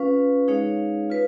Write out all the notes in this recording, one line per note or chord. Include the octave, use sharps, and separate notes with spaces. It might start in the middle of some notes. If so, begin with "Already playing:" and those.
Already playing: C#4 F4 B4 F5
G#3 D#4 G#4 C#5 F5
F4 B4